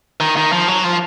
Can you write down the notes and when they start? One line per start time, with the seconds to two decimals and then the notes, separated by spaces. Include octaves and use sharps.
0.20 D#3
0.37 D#3
0.52 F3
0.68 F#3
0.84 F3